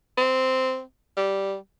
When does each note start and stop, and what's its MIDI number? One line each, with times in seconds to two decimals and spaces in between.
0.17 0.82 60
1.17 1.56 55